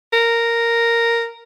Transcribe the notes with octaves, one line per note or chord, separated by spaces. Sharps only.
A#4